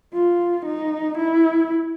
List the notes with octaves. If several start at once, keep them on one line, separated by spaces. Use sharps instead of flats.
F4
D#4
E4